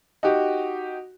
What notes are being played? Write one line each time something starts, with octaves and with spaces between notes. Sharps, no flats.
D#4 F#4 G4